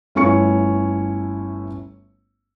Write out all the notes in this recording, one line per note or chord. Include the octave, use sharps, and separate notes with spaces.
G1 A3 C#4 E4 C#6 C#7